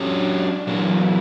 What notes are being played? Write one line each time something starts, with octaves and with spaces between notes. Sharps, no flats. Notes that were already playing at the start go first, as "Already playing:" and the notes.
Already playing: F#3 C#4 D4 G4 C#5
A#2 E3 F#3 A#3 E4